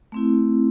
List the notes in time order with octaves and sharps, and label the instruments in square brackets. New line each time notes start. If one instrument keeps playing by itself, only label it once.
[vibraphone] A3 C4 E4